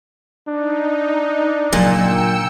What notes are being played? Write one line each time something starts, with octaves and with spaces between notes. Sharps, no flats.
D4 D#4
A#2 C#3 F#3 G5 E6 C#7